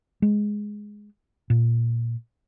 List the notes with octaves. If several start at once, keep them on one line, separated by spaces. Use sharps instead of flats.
G#3
A#2